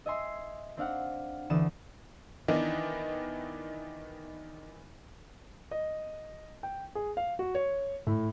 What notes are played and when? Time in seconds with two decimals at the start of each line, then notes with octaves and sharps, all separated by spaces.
0.06 D#5 E5 G#5 C6
0.77 C4 D4 F5 F#5
1.50 D2 E3 D4 D#6 E7
2.48 D#3 E3 B3 D4 D#4
5.71 D#5
6.63 G5
6.95 G#4
7.17 F5
7.39 F#4
7.55 C#5
8.07 A2